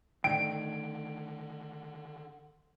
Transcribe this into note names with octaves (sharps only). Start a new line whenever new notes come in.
D3 D#3 A3 D4 D#4 G5 D7